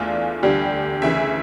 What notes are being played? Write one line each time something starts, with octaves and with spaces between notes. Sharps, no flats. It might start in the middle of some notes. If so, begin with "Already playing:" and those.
Already playing: E2 E3 A3 D4 F4
D2 D3 G3 D4 G4
D2 C#3 E3 E5